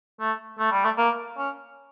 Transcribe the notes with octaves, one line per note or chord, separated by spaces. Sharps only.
A3
A3
G3
A3
A#3
C#4